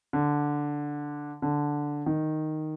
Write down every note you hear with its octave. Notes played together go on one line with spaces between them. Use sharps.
D3
D3
D#3